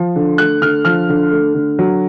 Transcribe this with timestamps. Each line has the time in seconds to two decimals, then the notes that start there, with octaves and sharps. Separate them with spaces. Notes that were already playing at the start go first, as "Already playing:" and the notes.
Already playing: F3
0.16 D3
0.38 A3 F#6
0.62 D3 F6
0.85 F3 F6
1.09 D3
1.31 A3
1.54 D3
1.79 F#3